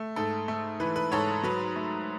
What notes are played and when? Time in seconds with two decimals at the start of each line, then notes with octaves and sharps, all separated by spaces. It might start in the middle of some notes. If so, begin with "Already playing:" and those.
Already playing: A3
0.16 G#2 A4
0.48 A3
0.80 E3 B4
0.96 B4
1.12 G#2 A4 C#5
1.44 F#3 B4
1.76 A3